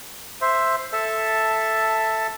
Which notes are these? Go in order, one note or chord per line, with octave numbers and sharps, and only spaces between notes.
C5 E5
A4 E5 A5